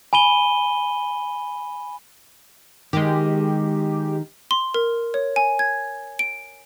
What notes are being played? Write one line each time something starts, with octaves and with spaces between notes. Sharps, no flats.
G#5 B5 D#7 G7
D#3 G#3 G4
C6
A#4
C#5
G#5
G#6
D7